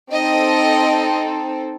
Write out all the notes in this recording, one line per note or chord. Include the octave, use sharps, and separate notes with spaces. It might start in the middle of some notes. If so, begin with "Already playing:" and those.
C4 D#4 A4 D#5